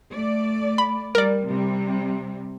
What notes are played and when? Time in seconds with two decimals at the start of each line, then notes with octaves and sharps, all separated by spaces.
0.14 A3 D5
0.78 B5
1.15 G3 A#4 D5
1.48 C3 G3